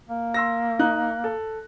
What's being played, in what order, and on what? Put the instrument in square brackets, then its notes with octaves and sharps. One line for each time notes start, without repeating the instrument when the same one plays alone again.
[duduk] A#3
[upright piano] C6 E6 A#6
D#4 F#6
A4